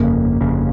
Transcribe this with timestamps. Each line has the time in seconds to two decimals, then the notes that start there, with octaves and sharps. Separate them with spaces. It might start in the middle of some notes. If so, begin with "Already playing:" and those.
Already playing: G1 F2 C#3 A#3
0.40 G1 F2 C#3